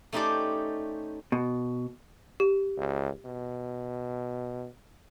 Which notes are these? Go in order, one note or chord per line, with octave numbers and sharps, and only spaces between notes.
A3 C#4 D#4 G4 C5 D5
B2
G4
C#2
B2